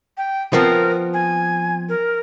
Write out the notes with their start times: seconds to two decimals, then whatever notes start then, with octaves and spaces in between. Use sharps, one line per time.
0.17 G5
0.53 F3 B3 C4 A#4
1.14 G#5
1.89 A#4